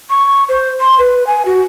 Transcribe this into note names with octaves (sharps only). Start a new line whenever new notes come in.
C#6
C5
C6
B4
G#5
F#4